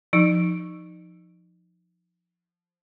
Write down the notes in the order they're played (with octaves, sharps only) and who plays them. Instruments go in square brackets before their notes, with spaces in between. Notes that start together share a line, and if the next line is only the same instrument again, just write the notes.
[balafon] F3 D#4